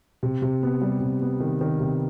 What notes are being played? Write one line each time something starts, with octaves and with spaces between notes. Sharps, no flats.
C3
C3
B3
G3
C3
B3
D#3
D#3
C3